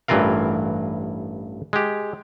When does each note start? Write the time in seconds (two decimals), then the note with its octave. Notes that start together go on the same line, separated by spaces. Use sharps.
0.08 A1 G2 E3 F4 A#4 F5
1.73 G#3 G4